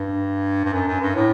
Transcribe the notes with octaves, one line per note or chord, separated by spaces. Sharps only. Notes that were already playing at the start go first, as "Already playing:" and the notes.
Already playing: G2
G2
F#2
F#2
G2
A2